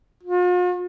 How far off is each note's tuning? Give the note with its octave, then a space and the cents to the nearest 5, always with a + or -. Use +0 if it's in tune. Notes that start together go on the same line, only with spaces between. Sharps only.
F4 +45